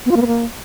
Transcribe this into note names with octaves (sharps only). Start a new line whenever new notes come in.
B3
F4
A#3
B3
A#3